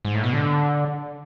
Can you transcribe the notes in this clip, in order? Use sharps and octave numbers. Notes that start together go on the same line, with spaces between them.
G#2
A2
B2
D3